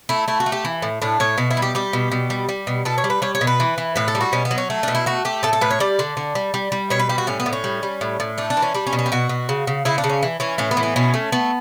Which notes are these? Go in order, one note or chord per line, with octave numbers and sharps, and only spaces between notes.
A3 E4
A3 E4
F#4
A3
G4
E3
A2
A2 D4
A2 C#5
B2 F#4
E4
G3
G4
G3 G4
B2
B2
G3
G3
B2
B2 A4
C#5
G3
B4
G3 C#5
C#5
B2
B4
E3
E3
A2 B4
A4
G3
F#4
B2 C#4
B3
F#3
C#4
A3
B2 D4
E4
A3 F#4
A3 G4
A2 A4
A4
A2 B4
C#5
G3 D5
D3
D3
G3
G3
G3
B2 C#5
B4
G3 G4
F#4
A2 C#4
B3
A2
C#4
G3
G3
A2
A2
A3 D4
D4
E3
C#4
G3 D4
C#4
B2
C#4
G4
B2 F#4
B2
C#3
C#3
C#3 E4
D4
C#3
C#4
E3
E3 C#4
A2 C#4
B3
E3
B3
B2 C#4
A3
A3 B3